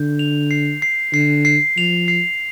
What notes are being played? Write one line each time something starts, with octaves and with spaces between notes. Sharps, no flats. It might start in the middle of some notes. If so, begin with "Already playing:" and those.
Already playing: D3 G6
F7
C7
C7
D3 C7
C7
F3 F7
C7